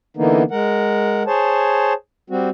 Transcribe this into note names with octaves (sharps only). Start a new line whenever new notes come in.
D3 E3 A#3 B3 D#4
G#3 A#4 F#5
G#4 C5 C#5 A5
G3 C4 F#4